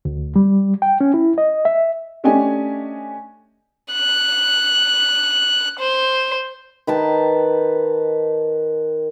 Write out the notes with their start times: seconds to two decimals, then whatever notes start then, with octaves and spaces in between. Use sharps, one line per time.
0.05 D2
0.36 G3
0.82 G5
1.01 C#4
1.14 E4
1.38 D#5
1.65 E5
2.24 A3 C#4 D4 G4 D#5 G#5
3.93 F#6
5.79 C5
6.87 D#3 B4 G5 A5